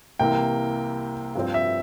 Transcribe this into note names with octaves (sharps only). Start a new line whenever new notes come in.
C2 C3 E3 A#3 G5
G2 F3 C4
E5